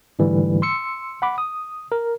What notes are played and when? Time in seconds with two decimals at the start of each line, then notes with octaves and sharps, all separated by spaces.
0.19 G#2 D3 E3 G3 A3
0.62 C6 E6 C#7
1.22 F#5 B5 D6
1.38 D#6
1.92 A#4